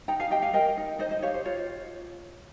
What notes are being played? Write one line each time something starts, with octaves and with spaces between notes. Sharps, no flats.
D#4 G5 A#5
F5 G#5
G4 D#5 G5
F5 G#5
A#4 D#5 G5
D#4
D#4 C5 D#5
C5 D#5
G4 C#5 F5
C5
F4 C#5